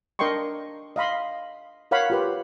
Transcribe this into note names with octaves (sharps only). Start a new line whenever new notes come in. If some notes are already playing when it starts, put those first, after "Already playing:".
D4 A#4 D#5 G5 C6 C#6
D#5 F5 B5 C6
A#4 C#5 F5 F#5 B5
F4 G4 B4